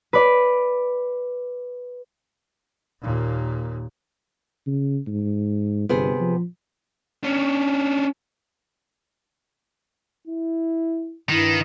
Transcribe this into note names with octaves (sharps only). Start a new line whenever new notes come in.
B4 D5
D#2 A#2
C#3
G#2
G1 C3 B3 G#4
F3
C#4 D4
E4
G2 D#3 E4